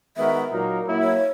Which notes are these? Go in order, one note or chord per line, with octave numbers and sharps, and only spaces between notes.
D#3 G#3 B3 F#4 A#4 E5
A#2 F#3 A#3 D#4 A#4
F#3 A#3 E4
C#5